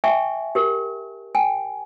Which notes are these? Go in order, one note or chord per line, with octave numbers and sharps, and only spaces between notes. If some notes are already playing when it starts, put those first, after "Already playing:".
E5 G5 G#5 C#6
G4 A#4
G5 G#5